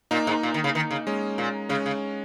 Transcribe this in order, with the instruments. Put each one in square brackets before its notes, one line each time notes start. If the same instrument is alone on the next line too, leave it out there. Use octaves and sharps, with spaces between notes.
[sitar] A#2 [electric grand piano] A#3 D#4
[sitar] G#2
A#2
D#3
C#3
D#3
C#3
[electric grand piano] G#3 C#4
[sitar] A#2
[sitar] C#3 [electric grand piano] G#3 C#4
[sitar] C#3